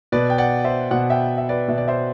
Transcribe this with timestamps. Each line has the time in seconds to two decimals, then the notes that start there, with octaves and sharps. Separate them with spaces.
0.12 B2 B4 D5
0.30 G5
0.38 D5 F#5
0.64 C5 E5
0.91 B2 D5 F#5
1.10 E5 G5
1.38 E5
1.49 B4 D5
1.68 B2 E5
1.78 D5
1.88 C5 E5